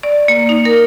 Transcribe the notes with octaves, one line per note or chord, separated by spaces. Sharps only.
D5
A#3
D#4
A#4